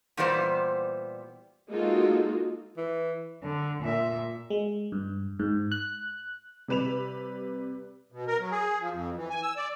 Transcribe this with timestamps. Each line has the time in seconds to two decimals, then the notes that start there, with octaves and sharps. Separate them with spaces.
0.17 A#2 E3 G3 B3 C5
1.70 G#3 A#3 D#4 F4 F#4 A4
2.77 E3
3.43 D3
3.82 A#2 E5
4.50 G#3
4.92 G2
5.39 G#2
5.72 F#6
6.68 C3 G3 B4 E7 F7
8.12 B2
8.28 A#4
8.39 F#3
8.51 G#4
8.80 F3
8.92 F2
9.16 E3
9.30 G#5
9.43 E6
9.56 D5